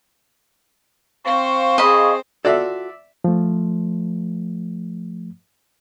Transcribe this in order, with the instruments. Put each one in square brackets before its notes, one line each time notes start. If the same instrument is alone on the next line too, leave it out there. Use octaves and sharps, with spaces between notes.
[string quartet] C4 C5 [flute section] F5 C#6
[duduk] G#4 [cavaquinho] D#5 B5
[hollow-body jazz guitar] F4 F#4 A4 [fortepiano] D5 E5
[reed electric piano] F3 A3